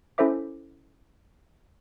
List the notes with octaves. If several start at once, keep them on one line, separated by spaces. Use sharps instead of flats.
C#4 E4 A4 C5 E5 D6